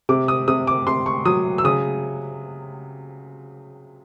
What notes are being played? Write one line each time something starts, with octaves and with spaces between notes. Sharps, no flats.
C3 D6
D#6
C3 D#6
D6
C3 C6
C#6
F#3 D#6
E6
C#3 D#6